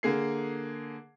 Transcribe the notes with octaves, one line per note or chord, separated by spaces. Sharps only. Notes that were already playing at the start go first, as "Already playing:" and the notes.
D3 A#3 G#4 C7